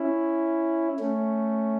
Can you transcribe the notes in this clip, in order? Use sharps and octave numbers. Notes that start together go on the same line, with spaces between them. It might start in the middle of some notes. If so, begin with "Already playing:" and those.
Already playing: C#4 E4
A3 C#4